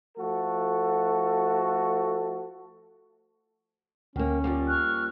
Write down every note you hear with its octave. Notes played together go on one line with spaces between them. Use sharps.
F3 A3 F#4 A4
D2 D#3 A#3 C#4
F3 G3 A#3
C#6 F6 F#6